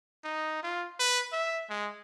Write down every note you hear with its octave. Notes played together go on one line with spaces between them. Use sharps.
D#4
F4
B4
E5
G#3